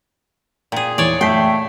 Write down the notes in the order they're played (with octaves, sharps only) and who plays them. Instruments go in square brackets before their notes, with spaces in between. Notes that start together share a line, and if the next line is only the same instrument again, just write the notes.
[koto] A#2 G#4 [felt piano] G5
[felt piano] E2 E3 [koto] C#5 D5
[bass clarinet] A3 [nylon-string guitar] G5 [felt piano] B6 C7